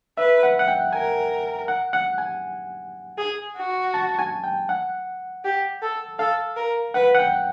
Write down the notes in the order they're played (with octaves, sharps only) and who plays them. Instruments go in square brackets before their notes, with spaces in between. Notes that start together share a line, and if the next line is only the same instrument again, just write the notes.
[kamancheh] B4 [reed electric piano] E5
[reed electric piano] F#5
F#5
G5
[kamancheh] A#4 [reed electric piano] G#5
[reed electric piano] F#5
F#5
G#5
[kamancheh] G#4
F#4
[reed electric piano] A5
G#5
G5
F#5
[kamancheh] G4
A4
[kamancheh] A4 [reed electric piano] F5
[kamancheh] A#4
[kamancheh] B4 [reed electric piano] F#5
[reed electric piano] F#5
G5